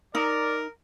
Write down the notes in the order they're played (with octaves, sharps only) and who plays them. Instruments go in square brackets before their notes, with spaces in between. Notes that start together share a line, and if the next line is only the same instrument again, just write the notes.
[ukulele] D#4 [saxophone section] A#4 [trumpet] D5